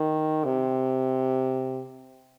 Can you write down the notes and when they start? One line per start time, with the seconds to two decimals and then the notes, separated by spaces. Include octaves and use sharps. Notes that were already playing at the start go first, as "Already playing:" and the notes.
Already playing: D#3
0.45 C3